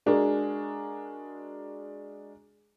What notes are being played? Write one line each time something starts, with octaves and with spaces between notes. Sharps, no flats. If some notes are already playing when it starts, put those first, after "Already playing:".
G#3 D4 F#4 G#4 A#4